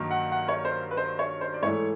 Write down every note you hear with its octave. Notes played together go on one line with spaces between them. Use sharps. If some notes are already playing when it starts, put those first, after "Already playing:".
Already playing: G2 D#3 F#3 A#3
F#5
F#5
C#5
C5
B4
C5
C#5
C5
D5
G#2 E3 A3 C#5